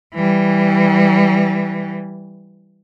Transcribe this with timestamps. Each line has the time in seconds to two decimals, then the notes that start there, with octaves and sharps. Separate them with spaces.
0.15 E3 G3